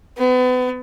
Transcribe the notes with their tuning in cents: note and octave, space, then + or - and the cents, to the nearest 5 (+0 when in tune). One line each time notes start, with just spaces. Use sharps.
B3 +35